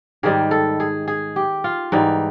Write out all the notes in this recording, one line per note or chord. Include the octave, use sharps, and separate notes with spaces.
G#2 D#3 G3 G#4
A4
G#4
G#4
G4
F4
G#2 E3 G3 D#4